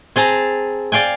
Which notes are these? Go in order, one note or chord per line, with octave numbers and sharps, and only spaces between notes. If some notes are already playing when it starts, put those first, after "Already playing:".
C4 G#4 A5 A#5
D5 F5 G5 G#5